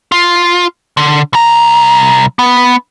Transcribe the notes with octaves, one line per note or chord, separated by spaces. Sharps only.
F4
D3
C2 A#5
B3